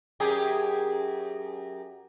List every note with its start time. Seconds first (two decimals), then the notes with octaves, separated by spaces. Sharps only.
0.20 F#2 G4 G#4